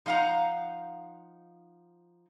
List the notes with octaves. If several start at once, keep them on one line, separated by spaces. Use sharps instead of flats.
F3 D#4 F5 F#5 A#5